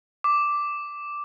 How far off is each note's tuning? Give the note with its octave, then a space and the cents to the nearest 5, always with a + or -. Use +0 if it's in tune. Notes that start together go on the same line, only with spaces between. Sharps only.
D6 -5